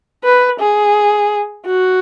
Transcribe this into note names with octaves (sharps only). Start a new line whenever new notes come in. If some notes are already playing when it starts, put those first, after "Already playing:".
B4
G#4
F#4